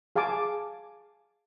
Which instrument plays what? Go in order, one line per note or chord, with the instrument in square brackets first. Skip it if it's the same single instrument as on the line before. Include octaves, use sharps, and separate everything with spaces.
[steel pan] G#4 F5 G#5 A5 D6